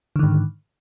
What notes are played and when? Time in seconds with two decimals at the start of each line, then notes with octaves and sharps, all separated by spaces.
0.16 D3
0.19 D#3
0.23 G#2